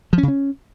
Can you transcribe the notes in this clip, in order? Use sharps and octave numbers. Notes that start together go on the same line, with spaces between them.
F3
C#4
C#3
C#4